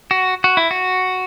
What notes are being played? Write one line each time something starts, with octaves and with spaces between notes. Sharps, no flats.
F#4
F#4
E4
F#4